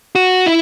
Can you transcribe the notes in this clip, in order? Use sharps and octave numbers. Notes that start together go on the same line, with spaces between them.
F#4
E4